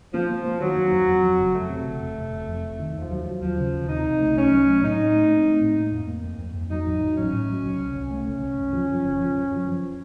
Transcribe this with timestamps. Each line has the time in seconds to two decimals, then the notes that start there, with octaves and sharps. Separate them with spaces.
0.13 F3 A#3
0.29 A#3
0.45 A#3
0.60 D#3 F#3
0.76 F#2
0.92 F#2
1.08 F2
1.23 F2
1.38 F#1
1.54 F2 A3
1.69 C3
1.85 F#1
2.01 F1
2.16 F1
2.32 F1
2.48 F2
2.63 F1
2.79 D#3
2.94 D#2 F3
3.11 F#3
3.26 F#3
3.41 D#2 F3
3.57 C#3
3.73 D#2
3.88 C3 D#4
4.04 C2
4.20 A3
4.35 C2 C#4
4.51 F#3
4.67 A3
4.82 A2 D#4
4.98 C4
5.13 A3
5.29 C4
5.45 A3
5.61 A2
5.77 A#3
5.92 F2
6.07 A#3
6.23 F2
6.38 F2
6.54 F2
6.70 F#3 D#4
6.85 A1
7.01 F#3
7.17 A1 C#4
7.33 A2
7.49 F#3
7.64 C2
7.79 C2
7.95 C2
8.10 A3 C#4
8.26 C2
8.42 C2
8.58 F#2
8.73 F3
8.90 F3
9.04 F#1
9.21 F3
9.36 F#2
9.52 F3
9.67 F3